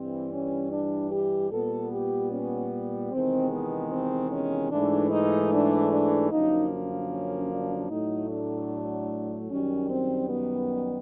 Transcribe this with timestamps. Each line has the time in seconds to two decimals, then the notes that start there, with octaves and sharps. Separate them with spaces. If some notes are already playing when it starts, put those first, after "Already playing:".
Already playing: G2 E3 G3 C4
0.32 C#4
0.72 D4
1.12 G4
1.52 A#2 G3 B3 A4
1.92 G4
2.32 C#4
3.12 E2 C3 D#3 G#3 C4
3.51 B3
3.91 C4
4.31 C#4
4.71 G#2 E3 A3 D4
5.11 D#4
5.51 D4
5.91 D4
6.31 F#2 D3 F3 A#3 D#4
7.11 C#4
7.51 D4
7.90 A2 F#3 A3 D#4
8.30 D4
9.50 F#2 D#3 G3 C#4
9.90 C4
10.29 B3